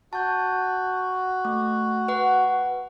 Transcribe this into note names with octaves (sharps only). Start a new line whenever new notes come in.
F#4 A5 G6
A3
B4 F#5